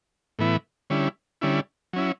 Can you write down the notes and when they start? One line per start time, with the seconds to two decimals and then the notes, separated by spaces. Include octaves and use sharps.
0.39 A2 E3 B3 E4
0.90 D3 G3 C#4 E4
1.41 D3 G3 C#4 E4
1.93 F#3 C#4 E4